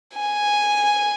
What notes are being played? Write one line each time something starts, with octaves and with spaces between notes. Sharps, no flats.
G#5